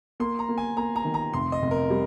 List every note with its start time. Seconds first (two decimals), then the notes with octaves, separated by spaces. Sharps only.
0.20 A#3 C6
0.39 A#5
0.49 A#3
0.58 G#5
0.77 A#3 A#5
0.96 A#5
1.05 D#3
1.14 A#5
1.33 F1 C6
1.52 D#5
1.62 F1
1.71 A#4
1.90 G3